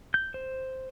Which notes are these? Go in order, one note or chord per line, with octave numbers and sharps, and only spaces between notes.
G6
C5